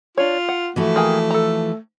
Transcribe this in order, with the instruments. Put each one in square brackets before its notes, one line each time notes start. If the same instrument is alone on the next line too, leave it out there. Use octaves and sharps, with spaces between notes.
[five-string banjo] D4 C#5 [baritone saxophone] F4
[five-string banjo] F#5
[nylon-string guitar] E3 F3 F#4 [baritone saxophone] A3
[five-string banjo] A#3 G#4 G5
A4 A#5